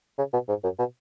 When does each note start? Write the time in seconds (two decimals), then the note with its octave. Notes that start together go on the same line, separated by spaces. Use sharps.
0.18 C#3
0.33 B2
0.49 G#2
0.64 F#2
0.79 B2